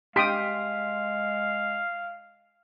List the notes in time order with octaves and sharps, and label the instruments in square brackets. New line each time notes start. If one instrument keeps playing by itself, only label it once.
[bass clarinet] G#3 [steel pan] G4 G5 D#6 [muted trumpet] F5 [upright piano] C6 B6 D7